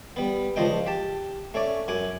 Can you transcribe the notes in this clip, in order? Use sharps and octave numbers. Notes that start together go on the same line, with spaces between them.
G3 B3
C#2 F3 D4 D#5 G5
G4 A5
A3 C#4 D5 D6
F#2 F#5 G#5 D6